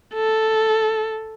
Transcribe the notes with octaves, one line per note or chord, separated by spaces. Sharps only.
A4